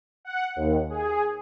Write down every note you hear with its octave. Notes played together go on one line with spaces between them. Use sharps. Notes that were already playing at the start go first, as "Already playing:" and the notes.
F#5
D#2
G#4